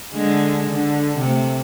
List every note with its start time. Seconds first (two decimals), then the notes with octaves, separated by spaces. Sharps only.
0.12 D3 G#3
0.70 D3
1.18 C3 A3